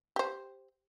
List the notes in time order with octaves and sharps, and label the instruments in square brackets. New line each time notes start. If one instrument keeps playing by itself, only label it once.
[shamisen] G4 C5